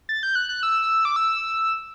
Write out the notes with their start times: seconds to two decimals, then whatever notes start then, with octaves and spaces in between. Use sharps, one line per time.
0.09 A6
0.23 G6
0.35 F#6
0.49 F#6
0.63 E6
1.05 D6
1.16 E6